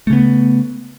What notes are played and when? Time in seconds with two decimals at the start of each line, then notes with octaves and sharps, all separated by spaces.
0.07 A3
0.10 C#3
0.13 B3